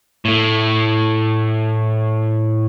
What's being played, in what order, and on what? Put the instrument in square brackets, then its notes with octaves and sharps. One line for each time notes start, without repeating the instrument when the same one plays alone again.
[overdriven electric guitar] A2 A3